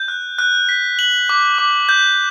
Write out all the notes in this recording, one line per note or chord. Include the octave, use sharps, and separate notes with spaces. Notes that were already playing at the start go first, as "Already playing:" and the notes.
Already playing: G6
F#6
F#6
B6
F#7
D6
D6
G6